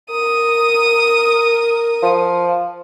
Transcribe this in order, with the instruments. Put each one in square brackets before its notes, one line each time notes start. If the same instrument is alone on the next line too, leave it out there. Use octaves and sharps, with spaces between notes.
[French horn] A#4 [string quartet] D#6
[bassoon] F3